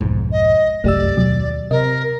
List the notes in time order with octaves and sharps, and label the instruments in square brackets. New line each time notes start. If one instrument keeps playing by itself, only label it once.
[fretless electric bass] B1 F2 G#2
[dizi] D#5
[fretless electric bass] G1 C2 F#2 [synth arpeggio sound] A3 G4 E6 [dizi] D5
[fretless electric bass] D#2 [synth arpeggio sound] B2 F#3
[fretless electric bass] C3 [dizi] A#4 [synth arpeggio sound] D#5